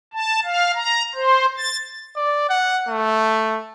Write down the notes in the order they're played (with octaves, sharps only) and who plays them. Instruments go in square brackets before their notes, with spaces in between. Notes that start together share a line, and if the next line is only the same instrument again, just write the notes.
[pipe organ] A5
F5
A#5
C5
A6
[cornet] D5
F#5
A3